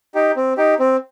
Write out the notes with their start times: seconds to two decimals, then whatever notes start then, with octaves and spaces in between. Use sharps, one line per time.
0.15 D#4 G4
0.36 C4
0.57 D#4 G4
0.79 C4